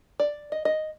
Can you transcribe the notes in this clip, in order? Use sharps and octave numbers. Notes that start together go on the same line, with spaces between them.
D5
D#5
D#5